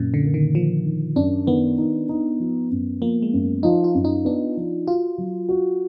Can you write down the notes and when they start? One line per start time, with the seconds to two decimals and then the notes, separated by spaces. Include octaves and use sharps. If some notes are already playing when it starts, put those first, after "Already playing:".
Already playing: F#2 A#2
0.14 D3
0.23 A#3
0.34 D#3
0.55 F3 A#3
0.85 D#3
1.16 F#2 D4
1.47 D#3 B3
1.78 D#4
2.09 D#4
2.40 F3
2.71 F#2
3.01 F3 A#3
3.22 G#3
3.33 F#2
3.63 F3 D#4
3.84 F4
3.95 F#2
4.05 D#4
4.25 B3 D4
4.57 F3
4.87 F4 F#4
5.18 F#3
5.49 F#4